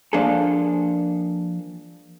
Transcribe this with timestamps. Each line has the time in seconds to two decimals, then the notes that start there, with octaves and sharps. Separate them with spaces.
0.13 F3 A#3 D4 G#4 A4